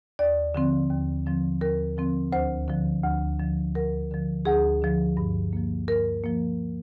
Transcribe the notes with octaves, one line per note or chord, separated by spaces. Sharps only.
D#2 D5
D3 F3 C4
D#2
D3 F3 C4
D#2 A#4
D3 F3 C4
D2 C5
D3 F3
D2
D3 F3
D2 A#4
D3 F3
D2 G#4
D3 F3
G2
F3 A#3
G2 A#4
F3 A#3